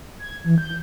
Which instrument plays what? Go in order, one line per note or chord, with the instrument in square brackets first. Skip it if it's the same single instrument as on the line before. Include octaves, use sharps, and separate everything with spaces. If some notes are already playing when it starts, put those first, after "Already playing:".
[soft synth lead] G#6
E3
G6